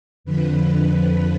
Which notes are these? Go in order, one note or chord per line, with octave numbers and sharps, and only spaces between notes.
F2 D3 F3 B4